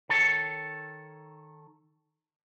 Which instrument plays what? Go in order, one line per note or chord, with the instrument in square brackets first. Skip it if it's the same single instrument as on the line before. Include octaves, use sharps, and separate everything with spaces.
[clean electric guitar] D#3 A4 C#5